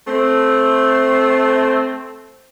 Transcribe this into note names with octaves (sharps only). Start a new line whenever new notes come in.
A3 C4